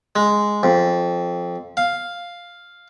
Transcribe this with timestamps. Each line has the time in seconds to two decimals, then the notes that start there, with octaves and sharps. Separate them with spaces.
0.16 G#3
0.63 F2
1.77 F5